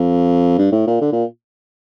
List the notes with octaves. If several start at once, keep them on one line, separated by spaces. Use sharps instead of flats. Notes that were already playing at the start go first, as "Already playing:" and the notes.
Already playing: F2
G2
A2
A#2
D3
A#2